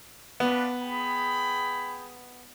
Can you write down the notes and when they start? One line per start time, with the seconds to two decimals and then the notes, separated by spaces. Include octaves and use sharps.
0.40 B3 D4 F4 B4
0.82 G#4 G5 B5